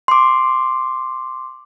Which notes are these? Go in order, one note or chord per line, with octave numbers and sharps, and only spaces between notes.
C6 D6